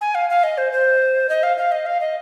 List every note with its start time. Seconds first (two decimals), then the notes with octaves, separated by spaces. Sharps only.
0.01 G#5
0.15 F5
0.30 F5
0.43 D#5
0.58 C5
0.72 C5
1.29 D#5
1.43 F5
1.57 F5
1.72 D#5
1.86 F5
2.00 D#5